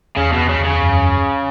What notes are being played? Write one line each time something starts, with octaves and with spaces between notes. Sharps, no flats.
E2 C#3
B2
E2
C#3
E2 C#3
F#2